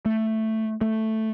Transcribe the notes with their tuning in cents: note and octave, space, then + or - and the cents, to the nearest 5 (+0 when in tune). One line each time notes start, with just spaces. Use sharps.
A3 +5
A3 +0